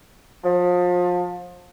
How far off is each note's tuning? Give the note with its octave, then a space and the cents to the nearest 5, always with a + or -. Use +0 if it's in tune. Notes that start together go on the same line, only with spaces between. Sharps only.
F3 +30